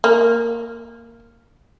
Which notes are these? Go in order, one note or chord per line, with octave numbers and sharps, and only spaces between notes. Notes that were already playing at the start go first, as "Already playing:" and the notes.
A#3